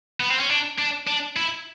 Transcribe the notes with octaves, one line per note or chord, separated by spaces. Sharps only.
B3
C4
C#4
D4
D4
D4
E4